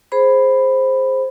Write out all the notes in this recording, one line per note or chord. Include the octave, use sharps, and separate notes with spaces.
G#4 C5 B5